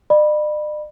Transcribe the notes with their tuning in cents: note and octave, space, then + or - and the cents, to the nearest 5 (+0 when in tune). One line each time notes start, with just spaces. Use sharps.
D5 +45 B5 -10